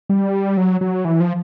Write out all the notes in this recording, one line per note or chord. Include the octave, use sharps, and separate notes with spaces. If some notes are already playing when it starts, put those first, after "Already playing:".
G3
F#3
F#3
E3
F3